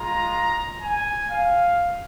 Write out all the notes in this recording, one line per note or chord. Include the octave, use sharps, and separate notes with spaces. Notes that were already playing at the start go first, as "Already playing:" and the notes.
Already playing: G#3 F4 A#5
G#5
F5